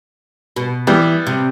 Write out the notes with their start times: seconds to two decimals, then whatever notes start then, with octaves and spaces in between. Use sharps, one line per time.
0.56 B2
0.87 E3 G3 B3
1.27 C3